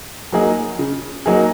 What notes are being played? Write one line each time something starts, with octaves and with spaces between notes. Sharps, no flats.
F#3 A#3 D#4 G#4
C#3
F#3 A#3 D#4 G#4